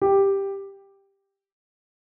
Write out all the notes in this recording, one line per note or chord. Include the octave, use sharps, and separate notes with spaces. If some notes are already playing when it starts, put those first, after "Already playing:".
G4